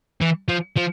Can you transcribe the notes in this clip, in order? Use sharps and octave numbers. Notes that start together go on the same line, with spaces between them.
E3
F3
F3